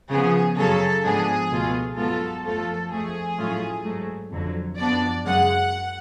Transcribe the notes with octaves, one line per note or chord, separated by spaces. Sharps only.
C#3 F3 B3 G#4
F#2 C#3 F#3 C#4 A4
G#2 F3 B3 D4 G#4
C#2 B2 A3 F4
G#2 F#3 B3 F4 A4
F#2 F3 A3 F4 A4
F2 F3 A3 G#4
A2 F#3 A3 C#4 F4
G#2 F#3 A3
F2 D3 F#3
F#2 F3 B3 D4 D5
F#2 C#3 G#3 F#5